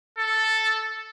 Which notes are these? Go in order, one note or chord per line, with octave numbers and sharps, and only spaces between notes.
A4